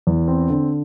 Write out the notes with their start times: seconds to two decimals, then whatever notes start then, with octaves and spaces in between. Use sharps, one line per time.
0.07 E2
0.28 C4
0.50 D3